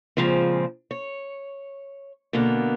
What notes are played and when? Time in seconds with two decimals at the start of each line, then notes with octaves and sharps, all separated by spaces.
0.17 A#2 C#3 F3 G#3 C4
0.91 C#5
2.33 B2 D3 A#3 B3